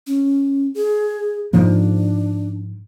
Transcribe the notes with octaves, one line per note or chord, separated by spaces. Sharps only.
C#4
G#4
G#2 F3 A#3 D4